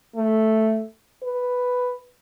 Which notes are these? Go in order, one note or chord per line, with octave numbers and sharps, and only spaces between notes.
A3
B4